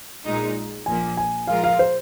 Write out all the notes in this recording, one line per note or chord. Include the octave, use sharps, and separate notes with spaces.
A#1 A#2 G#3 D#4
A#1 A#2 F3 A#3 G#5
G#5
A#2 F3 G#3 F4 A#4 F5
F5
C5